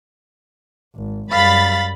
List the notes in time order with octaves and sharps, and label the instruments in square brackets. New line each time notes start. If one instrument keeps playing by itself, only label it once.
[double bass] G#1
[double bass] F#2 G3 [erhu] F5 [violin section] B5 A6